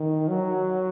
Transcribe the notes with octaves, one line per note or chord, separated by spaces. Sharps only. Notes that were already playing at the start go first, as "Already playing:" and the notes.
Already playing: D#3
F#3